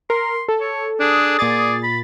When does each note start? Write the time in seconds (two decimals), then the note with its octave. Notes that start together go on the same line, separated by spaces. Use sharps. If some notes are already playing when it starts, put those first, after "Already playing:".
0.10 A#4 C6
0.48 A4
0.60 C#5
1.00 D4 G#4 D#6
1.39 A#2 G#4 D5 A6
1.83 B5